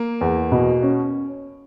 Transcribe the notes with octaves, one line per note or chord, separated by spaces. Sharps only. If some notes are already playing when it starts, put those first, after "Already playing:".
Already playing: A#3
E2
B2
C#4